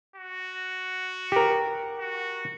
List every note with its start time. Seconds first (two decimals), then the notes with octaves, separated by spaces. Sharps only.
0.16 F#4
1.32 G4 A#4
1.99 F#4